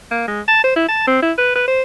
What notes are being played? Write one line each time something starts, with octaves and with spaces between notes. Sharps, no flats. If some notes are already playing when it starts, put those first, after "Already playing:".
A#3
G#3
A5
C5
E4
A5
C4
E4
B4
B4
C5